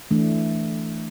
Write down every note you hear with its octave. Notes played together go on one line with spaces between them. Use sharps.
E3 A3 D4